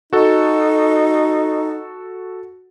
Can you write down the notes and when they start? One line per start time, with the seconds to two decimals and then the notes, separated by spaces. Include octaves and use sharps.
0.13 D#4 F#4 A4